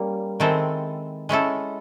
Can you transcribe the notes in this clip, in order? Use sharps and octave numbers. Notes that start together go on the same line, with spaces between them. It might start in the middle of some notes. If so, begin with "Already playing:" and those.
Already playing: G3 A#3 C#4
D#3 G#3 C4 E4 A4
G#3 C#4 E4 A4